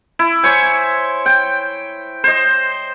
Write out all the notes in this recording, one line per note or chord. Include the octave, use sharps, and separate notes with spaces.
E4
C5 C#5 G#5
G5
C5 D#5